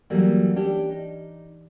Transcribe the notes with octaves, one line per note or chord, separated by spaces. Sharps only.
E3 F#3 G3 A3 A#3
C#4 D4 G4
D#4